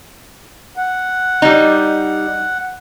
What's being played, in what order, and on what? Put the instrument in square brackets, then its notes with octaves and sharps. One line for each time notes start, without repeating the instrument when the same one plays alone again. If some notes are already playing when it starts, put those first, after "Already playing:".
[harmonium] F#5
[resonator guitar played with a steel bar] G3 D#4